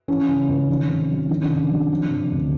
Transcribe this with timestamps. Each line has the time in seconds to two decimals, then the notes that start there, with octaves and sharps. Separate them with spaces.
0.08 E3 C#4
0.28 C#3
0.48 C#2
0.69 D#3
0.89 C3
1.10 F#3
1.29 D#3 D4
1.42 C#4
1.50 C3
1.56 D4
1.70 F#3
1.91 F3
2.11 C3
2.31 D2